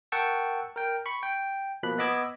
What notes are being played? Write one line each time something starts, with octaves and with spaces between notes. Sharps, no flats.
A#4 F#5 G5 A5 C#6 E6
A#4 G5
B5 C#6
G5
B2 F3 A#3 B5 F#6
B3 D#5 B5 D6 E6 G#6